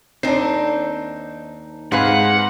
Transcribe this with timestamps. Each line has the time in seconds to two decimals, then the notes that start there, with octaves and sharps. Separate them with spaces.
0.23 D#2 C4 D4 D#4 C7
1.92 G#2 C4 G#4 B4 F5 F#5